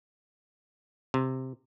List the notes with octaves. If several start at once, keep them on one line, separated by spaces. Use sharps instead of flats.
C3